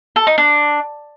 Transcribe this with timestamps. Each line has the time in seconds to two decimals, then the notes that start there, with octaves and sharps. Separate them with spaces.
0.16 A4
0.27 D#4
0.38 D4